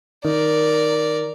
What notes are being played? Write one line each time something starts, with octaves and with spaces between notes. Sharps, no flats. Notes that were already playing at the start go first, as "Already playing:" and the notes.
D#3 A#4 D5